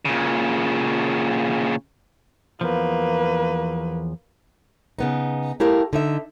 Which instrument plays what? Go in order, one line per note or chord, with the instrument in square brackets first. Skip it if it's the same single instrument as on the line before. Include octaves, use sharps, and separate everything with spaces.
[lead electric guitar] A#2 C#3
[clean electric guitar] E2 F3 [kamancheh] A#3 B4
[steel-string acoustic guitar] C#3 B3 D#4
A3 E4 G4 A#4 F5
D3 D#4 E5